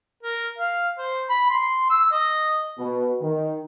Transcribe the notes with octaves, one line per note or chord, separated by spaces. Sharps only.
A#4
F5
C5
B5
C6
E6
D#5
B2
D#3